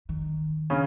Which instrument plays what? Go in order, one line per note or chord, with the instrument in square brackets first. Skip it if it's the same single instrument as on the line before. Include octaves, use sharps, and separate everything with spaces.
[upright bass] D#3
[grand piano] C#3 C#4